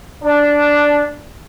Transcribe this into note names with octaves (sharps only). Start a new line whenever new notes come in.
D4